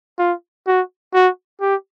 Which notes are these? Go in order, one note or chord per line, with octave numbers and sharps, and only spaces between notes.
F4
F#4
F#4
G4